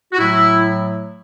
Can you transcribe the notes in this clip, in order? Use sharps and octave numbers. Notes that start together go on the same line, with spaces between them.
F#4
A2 F#3 A3 E4